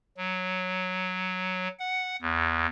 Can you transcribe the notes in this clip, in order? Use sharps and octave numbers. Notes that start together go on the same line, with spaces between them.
F#3
F#5
E2